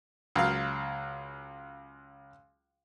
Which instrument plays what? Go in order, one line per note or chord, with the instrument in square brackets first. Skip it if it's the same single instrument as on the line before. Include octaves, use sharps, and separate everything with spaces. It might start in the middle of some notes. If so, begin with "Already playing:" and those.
[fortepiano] C#2 F#3 F5